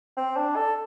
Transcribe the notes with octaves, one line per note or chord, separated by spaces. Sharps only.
C4
D4
A4